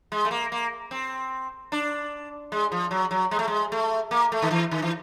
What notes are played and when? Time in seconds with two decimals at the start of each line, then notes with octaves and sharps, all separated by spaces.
0.12 G#3
0.25 A3
0.31 A#3
0.52 A#3
0.91 C4
1.72 D4
2.52 G#3
2.72 F3
2.91 F#3
3.11 F#3
3.31 G#3
3.39 A3
3.48 G#3
3.72 A3
4.11 A#3
4.32 A3
4.42 D#3
4.51 E3
4.71 D#3
4.82 E3